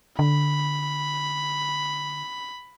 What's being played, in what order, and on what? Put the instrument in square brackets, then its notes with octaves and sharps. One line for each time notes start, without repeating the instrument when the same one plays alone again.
[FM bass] D3 [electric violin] B5